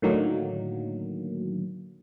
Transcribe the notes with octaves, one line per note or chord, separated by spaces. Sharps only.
A2 D3 D#3 F#3 A#3